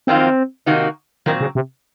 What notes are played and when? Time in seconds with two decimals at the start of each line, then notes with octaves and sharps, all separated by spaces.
0.07 F2 D#3 F#3 A#3 C4 F4
0.66 C3 D#3 A#3 D#4 F#4
1.26 A#2 D#3 F#3 C4
1.41 C#3
1.55 C3